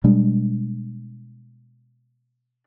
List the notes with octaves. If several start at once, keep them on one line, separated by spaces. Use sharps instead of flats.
B2 G3 G#3 D4